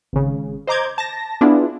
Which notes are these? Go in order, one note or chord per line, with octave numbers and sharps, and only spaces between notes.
G#1 C#3
C5 D#5 A#5 D6 G6 G#6
A5 A#6
B3 D4 E4 F4 G#4